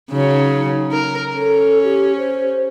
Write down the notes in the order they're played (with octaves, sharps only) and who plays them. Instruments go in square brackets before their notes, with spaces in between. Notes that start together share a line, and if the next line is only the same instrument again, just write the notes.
[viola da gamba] C#3 F#3 [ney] D#4
[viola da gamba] A#4
[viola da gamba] C#4 [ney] A4
[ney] G4
C5